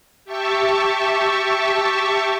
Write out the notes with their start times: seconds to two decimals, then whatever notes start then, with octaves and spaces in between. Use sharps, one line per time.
0.25 G4 E5 A5 C#6